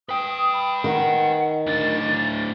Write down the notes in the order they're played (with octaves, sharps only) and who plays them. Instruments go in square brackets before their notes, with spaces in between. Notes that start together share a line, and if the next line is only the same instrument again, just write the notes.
[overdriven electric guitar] B4 G5 [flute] D#6
[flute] B5
[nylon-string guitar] D#3 [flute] F#5
[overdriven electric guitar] A2 D4 [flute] A6